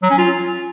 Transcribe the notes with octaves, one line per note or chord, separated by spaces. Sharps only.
F#3
C#4
F4